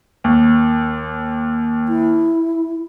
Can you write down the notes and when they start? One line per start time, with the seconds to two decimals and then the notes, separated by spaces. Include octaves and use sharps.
0.24 D#2
1.89 E4